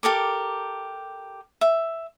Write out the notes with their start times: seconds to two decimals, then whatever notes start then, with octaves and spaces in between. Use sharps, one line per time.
0.03 G4 A4 A#4 D6
1.61 E5